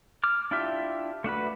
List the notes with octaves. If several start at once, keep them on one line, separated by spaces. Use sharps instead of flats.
D6 F6
D4 E4 F4 G4 E5
A3 D4 F#4 B4